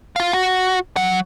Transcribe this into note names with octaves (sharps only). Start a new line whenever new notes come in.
F4 F5
F#4
F#3 F#5